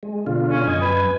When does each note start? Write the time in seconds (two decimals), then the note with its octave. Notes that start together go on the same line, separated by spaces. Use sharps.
0.03 G#3
0.26 B2 D3 F4
0.50 C#4
0.67 F#2 D#5 G#5
0.81 B4